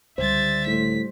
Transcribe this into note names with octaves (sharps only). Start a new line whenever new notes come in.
C#2 D3 G3 C5 E5 A6
A2 B6